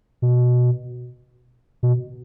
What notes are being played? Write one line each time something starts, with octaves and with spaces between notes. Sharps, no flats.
B2
B2